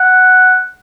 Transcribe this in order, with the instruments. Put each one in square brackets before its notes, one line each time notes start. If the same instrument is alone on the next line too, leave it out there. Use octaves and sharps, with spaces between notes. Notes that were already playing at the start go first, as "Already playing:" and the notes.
Already playing: [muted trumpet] F#5